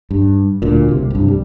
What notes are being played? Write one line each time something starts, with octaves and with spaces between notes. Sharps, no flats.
G2
D2 A#2
C2 C3
C2 G2
G3